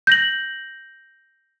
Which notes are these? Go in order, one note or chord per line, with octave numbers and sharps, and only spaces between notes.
G6 A#6 F#7